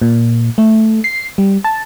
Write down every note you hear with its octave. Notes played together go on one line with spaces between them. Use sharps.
A#2
A3
C7
G3
A5